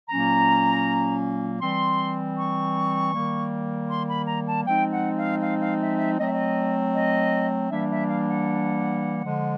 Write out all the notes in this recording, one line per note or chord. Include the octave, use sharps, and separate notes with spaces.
A#2 F#3 A#3 C#4 A#5
E3 G3 C4 C6
C#6
D#3 G3 A#3
C6
B5
A#5
A5
F3 G#3 C4 D#4 G5
F#5
F5
F5
F5
E5
E5
F#3 A3 C4 D#5
E5
D#5
D#5
E3 G3 A#3 D4 E5
E5
F5
F#5
D3 F3 G#3